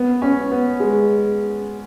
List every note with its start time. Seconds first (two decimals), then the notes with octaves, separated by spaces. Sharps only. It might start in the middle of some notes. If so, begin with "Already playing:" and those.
Already playing: B3
0.22 C#4
0.51 B3
0.80 G#3